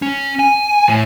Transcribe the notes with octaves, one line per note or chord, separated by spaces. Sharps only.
C#4
G#5
A2